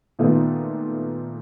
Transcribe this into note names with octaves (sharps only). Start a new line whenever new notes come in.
A#2 D#3 A3 B3 F4